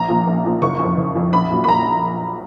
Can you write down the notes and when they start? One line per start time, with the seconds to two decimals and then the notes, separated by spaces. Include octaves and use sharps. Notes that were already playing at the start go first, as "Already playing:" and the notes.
Already playing: A#1 A#5
0.09 A#2 F3
0.27 A#1
0.45 A#2 F3
0.62 F#1 C#6
0.79 F2 F3
0.97 F#1
1.15 F2 F3
1.33 A#1 B5
1.51 A#2 F#3
1.64 B5
1.68 A#1 A#5